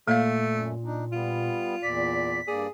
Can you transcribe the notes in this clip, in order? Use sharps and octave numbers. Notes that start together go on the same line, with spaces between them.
A#2 A3 A#3 F5
F#2
D4 D#4
G3 B3 F4
E2 A#2 D5 B6
G2 A#3 G#4 D5